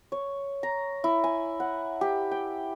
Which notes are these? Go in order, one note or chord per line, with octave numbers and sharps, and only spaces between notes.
C#5
A#5
E4
G#5
F#5
G4
G5